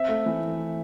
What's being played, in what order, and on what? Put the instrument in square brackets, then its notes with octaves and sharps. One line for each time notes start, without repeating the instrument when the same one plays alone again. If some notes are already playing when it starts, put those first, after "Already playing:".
Already playing: [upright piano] C4 [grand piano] E5
[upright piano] A3
E3